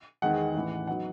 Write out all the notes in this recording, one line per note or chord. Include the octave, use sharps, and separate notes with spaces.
E2 D#3 G#3 F#5
A1 A2 E3
F#3 B3 D#4 F#5